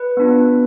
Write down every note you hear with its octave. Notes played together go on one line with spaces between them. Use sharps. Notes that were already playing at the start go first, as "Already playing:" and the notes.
Already playing: B4
B3 D4 F4